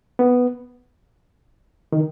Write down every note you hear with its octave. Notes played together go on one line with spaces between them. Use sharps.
B3
D#3